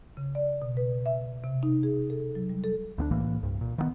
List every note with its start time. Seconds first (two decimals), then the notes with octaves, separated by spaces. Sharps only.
0.17 C#3
0.35 D5
0.62 B2
0.77 B4
1.06 E5
1.44 C3
1.63 D#4
1.83 G#4
2.10 A4
2.35 F#3
2.50 G3
2.64 A4
2.98 D2 B3 D4
3.11 C2 A2 E3 A#3
3.43 C2 G2
3.61 A#2
3.78 D#3 E3 B3